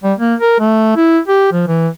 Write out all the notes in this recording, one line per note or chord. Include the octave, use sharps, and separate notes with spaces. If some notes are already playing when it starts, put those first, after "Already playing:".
G3
A#3
A#4
A3
E4
G4
F3
E3